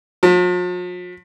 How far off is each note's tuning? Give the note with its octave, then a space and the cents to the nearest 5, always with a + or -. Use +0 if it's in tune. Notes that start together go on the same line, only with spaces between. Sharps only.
F3 +45